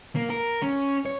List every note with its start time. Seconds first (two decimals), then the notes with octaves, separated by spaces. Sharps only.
0.16 A#3
0.30 A#4
0.62 C#4
1.05 C#5